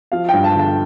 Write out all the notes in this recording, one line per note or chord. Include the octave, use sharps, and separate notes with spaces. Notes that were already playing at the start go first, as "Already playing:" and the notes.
F3 F5
G2 G5
A5
D3 A5